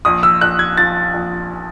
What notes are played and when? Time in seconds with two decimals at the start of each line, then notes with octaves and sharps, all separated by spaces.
0.05 A#1 D#6
0.23 E6
0.41 A#1 F#6
0.59 G#6
0.77 F3 A6
1.14 A#1